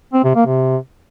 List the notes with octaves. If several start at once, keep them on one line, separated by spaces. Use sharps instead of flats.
C4
C3
A#3
C3